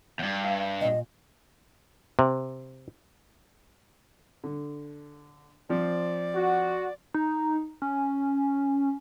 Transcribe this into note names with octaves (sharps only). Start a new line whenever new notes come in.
E2 G2
E5 F5
C#2 A#2 D#5
C3
D3
F3 C4 D5
F#4
D#4
C#4